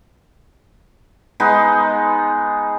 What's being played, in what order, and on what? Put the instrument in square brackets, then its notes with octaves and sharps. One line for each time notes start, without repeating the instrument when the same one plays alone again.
[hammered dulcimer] G#3 B3 D#4